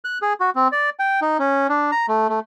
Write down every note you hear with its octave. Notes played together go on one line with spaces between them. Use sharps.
F#6
G#4
F#4
C4
D5
G5
D#4
C#4
D4
A#5
A3
A3